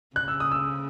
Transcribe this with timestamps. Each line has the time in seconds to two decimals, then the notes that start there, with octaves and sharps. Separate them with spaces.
0.16 C#3 F#6
0.28 E6
0.40 D#6
0.52 E6